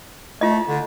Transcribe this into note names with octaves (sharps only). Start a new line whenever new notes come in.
A3 F4 D#5
D3